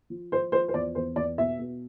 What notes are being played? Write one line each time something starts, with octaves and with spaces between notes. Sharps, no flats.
F3
F3 C5
F3 C5
C5
E2 D5
E2 C5
E2 D5
B2 E5
B2